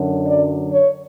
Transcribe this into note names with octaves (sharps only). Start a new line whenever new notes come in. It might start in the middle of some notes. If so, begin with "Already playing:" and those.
Already playing: F#2 D3 F#3
D5
C#5